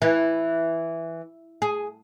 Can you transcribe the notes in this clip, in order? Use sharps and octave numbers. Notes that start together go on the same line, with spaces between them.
E3
G#4